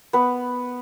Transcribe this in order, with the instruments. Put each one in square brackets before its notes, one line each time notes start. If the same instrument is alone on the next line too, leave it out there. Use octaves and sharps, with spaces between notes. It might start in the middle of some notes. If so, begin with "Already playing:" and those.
[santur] B3 B4